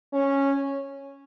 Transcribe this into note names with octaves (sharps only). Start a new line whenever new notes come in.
C#4